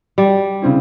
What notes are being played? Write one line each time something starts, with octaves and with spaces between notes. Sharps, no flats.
G3
C#3 C4 E4